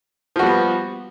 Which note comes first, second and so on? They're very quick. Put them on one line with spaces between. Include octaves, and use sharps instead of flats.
F3 F#4 G3 B3